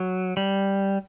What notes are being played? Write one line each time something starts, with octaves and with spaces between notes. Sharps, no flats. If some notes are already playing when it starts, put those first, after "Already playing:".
Already playing: F#3
G3